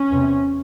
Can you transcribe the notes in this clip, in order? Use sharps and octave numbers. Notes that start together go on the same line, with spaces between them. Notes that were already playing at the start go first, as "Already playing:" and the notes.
Already playing: C#4
E2 C3